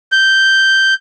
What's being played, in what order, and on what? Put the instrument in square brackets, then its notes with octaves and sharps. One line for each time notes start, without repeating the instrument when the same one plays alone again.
[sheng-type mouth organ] G6